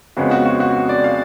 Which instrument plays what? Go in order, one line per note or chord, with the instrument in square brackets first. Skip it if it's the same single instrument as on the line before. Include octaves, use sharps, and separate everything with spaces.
[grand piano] F2 C#3 G#3 B3 F#4
F#4
F#4
F#4
D5
F5